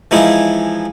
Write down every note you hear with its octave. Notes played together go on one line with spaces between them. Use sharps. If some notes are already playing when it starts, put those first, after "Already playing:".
E3 F3 G#3 D#4 E4